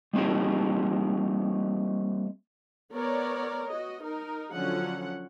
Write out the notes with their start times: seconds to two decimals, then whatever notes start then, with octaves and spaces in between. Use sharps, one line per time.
0.13 G3 A#3 C4 D#4 G4
2.93 B3 A#4 C#5 D5
3.69 F#4 D#5
4.01 D#4 A#4
4.54 D3 F3 F#3 C#4 F#5